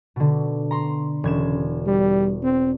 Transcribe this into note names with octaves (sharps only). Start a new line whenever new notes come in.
B2 D3
A#5 C6
E1 C#3 G#6 E7
G3
C4